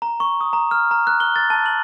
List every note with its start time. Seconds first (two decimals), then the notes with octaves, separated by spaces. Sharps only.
0.02 A#5
0.20 C#6
0.41 D#6
0.53 A#5
0.71 F6
0.91 A#5
1.07 F#6
1.20 G7
1.36 A6
1.50 A5
1.66 F#7